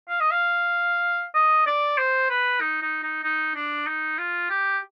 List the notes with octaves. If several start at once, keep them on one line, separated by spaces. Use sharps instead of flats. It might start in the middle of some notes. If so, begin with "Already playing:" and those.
F5
D#5
F5
D#5
D5
C5
B4
D#4
D#4
D#4
D#4
D4
D#4
F4
G4